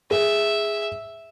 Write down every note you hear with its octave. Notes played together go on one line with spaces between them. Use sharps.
G#4 E5